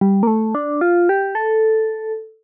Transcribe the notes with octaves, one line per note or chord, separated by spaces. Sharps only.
G3
A#3
A3
D4
F4
G4
A4